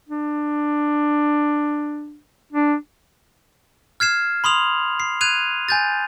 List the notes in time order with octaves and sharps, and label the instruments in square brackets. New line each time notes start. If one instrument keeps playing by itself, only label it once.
[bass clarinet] D4
D4
[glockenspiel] F6 G#6 C7 E7
B5 C6 D#6 F7 F#7
C7
F#6 G#6 D#7 F7
G#5 G6 A6